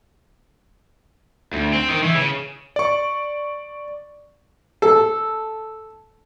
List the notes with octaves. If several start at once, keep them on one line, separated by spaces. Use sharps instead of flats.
D2
C4
D#3
E3
C#3
D5 C#6
A4